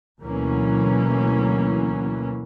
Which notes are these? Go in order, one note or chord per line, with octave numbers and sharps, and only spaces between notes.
D2 B2 E3 F#3 A#3 C#4